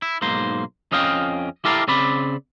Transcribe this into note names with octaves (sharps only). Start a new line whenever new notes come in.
E4
B1 G#2 A#3 C5
F2 C#4 D#5 F5 G5
E4 G4 A4 A#4 D5 F5
C#3 C4 D5 B5